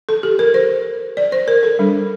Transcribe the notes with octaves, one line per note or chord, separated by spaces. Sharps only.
A4
G4
A#4
C5
D5
C5
A#4
A4
G3 D4